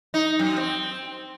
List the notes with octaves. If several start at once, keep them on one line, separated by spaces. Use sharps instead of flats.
D#4
F#2
C4